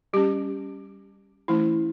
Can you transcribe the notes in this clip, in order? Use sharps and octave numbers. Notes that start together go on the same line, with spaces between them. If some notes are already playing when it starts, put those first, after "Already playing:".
G3 C#4 G4
E3 A3 C#4 E4